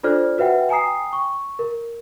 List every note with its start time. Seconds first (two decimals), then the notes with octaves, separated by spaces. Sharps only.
0.03 D4 F4 A4 C5 D5 F6
0.38 F#4 B4 E5 F#5 G5
0.69 G5 G#5 A#5 D#6 C7
1.13 C#6
1.59 A#4